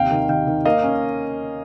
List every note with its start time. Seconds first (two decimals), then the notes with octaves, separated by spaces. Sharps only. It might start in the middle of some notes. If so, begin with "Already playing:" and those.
Already playing: D#2 C3 F5 G5
0.11 D#3
0.29 D#3 F5 G5
0.47 D#3
0.66 A#3 D#5 F5
0.84 C#4